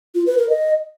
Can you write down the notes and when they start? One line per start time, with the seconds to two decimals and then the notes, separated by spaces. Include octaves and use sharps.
0.15 F4
0.26 B4
0.38 A#4
0.50 D#5